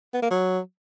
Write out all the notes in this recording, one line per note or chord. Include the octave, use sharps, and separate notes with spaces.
B3
A#3
F#3